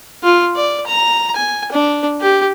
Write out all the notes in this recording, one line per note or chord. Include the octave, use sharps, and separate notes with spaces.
F4
D5
A#5
G#5
D4
G4